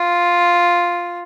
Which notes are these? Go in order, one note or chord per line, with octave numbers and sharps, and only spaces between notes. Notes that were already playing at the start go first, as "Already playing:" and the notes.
Already playing: F4